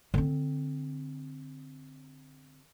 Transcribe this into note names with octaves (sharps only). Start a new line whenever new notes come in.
D3 C4